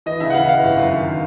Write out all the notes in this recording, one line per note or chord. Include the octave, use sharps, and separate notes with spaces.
E3 D#5
C#3 E5
F#5
E3 F5
E3 F5
G1
F#2
D#3